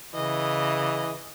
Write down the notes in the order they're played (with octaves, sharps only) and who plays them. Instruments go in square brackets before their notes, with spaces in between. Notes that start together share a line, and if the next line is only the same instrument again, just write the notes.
[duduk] C#3 [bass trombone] E3 [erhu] D#5